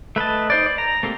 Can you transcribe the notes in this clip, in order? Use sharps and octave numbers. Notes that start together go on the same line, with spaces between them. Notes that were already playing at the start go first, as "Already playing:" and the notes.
A3 B4 D#5 A5
D#4 C5 D5
D5
A#5
A3 A#3 C4 G4